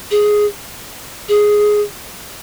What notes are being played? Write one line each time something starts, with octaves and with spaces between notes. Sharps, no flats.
G#4
G#4